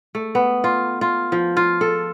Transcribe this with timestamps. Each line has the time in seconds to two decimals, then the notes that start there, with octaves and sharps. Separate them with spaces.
0.15 A3
0.35 B3
0.64 F4
1.01 F4
1.32 F3
1.57 F4
1.81 A4